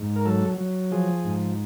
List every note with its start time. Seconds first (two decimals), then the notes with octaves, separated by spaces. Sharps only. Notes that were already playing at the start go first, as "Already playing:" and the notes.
Already playing: G#2
0.16 A#4
0.26 F#3 A4
0.58 F#3
0.91 F3 G#4
1.24 G#2